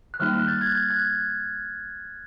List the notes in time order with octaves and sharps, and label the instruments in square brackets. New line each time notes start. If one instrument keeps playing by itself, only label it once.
[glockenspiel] F#6
[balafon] D#3 G3 A#3 D#4 [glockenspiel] F6
[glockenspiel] F#6
G6 A6
F#6 G#6
G6
F#6 G#6